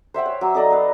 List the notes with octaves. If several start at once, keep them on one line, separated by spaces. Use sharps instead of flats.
C5 E5 F#5 G5
C#5
F#3 D6
D#4 A4 D5 D#5
B4 F5